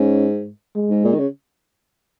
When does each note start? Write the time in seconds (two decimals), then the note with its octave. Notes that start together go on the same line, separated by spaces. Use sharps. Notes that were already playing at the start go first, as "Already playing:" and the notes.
Already playing: G#2 C#4
0.76 G#3
0.90 G#2
1.05 A#2
1.13 D#3
1.19 C#3